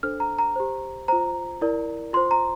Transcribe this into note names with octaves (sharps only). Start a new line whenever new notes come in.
D4 A4 C5 F6
A#5
A#5
G4 C5
F4 C5 A#5
E4 A#4 D5
F4 C5 C6
A#5